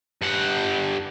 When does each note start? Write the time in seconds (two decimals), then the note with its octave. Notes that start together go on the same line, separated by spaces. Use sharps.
0.22 G2 F#5